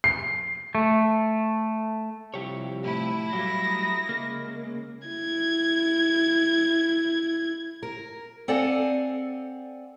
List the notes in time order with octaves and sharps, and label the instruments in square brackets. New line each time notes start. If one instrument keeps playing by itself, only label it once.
[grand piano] C7
[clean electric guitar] A3
[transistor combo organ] C3 F3 G3 [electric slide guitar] E4 G4 C#5
[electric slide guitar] A2 [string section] E4
[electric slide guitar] F#3 G3 A3 [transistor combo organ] F5 D6 [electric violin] A#6
[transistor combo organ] A#5 D#6
[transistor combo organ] C#3 G#3 [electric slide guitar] A#3
[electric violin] E4 G#6
[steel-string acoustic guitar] A#4
C4 A4 D5 F5 F#5 G#5